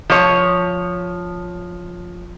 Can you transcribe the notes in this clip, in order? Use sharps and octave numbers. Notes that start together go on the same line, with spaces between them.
F3 C#5